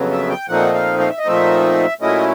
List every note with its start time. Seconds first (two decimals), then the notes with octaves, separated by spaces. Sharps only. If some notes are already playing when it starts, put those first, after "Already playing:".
Already playing: F2 C#3 F#3 B3
0.12 E5
0.29 G5
0.48 A#2 F3 A3 C4 D#4 F#5
0.74 F5
0.99 F5
1.10 E5
1.18 D#5
1.25 A#2 F3 A3 C4 D#4 E5
2.01 A#2 F#3 A3 C#4 E4 D#5